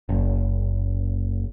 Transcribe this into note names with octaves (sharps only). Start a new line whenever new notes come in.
F#1